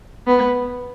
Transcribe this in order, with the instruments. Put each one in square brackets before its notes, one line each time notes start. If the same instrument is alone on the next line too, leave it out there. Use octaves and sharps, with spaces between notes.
[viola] B3